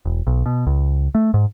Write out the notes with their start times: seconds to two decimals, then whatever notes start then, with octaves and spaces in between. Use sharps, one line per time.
0.05 E1
0.27 B1
0.46 B2
0.67 C#2
1.15 A3
1.34 G#2